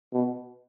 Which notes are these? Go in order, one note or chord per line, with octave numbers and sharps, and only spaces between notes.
B2